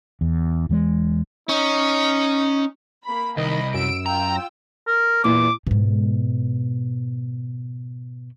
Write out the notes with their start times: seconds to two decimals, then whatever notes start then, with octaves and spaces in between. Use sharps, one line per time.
0.21 E2
0.69 E2 E3 G#3
1.49 C#4 D#4
3.04 A#3 B5
3.37 C2 D#3 D#5 B5
3.74 F#2 E6 D7
4.06 F4 G5 A#5 E6
4.87 A#4
5.24 E2 A#2 E4 D6
5.67 G#2 B2